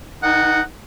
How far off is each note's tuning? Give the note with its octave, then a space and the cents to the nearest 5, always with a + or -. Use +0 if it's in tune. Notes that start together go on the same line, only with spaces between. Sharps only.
D#3 +35 D#4 -20 F#5 +0